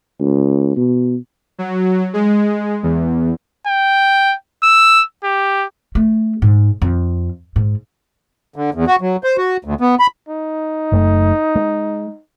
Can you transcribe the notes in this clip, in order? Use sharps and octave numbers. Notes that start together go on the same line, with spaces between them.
C#2
B2
F#3
G#3
E2
G5
E6
G4
A3
G#2
F2
G#2
D3
E2
F#4
F#3
C5
F#4
D2
B3
B5
D#4
F#1 F#2 A3
G#3